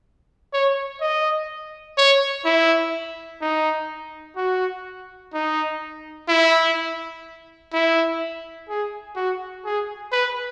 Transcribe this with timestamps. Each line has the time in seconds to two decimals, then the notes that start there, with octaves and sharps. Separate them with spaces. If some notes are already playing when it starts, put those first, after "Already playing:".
0.54 C#5
1.01 D#5
1.98 C#5
2.45 E4
3.41 D#4
4.37 F#4
5.34 D#4
6.29 E4
7.73 E4
8.69 G#4
9.16 F#4
9.65 G#4
10.12 B4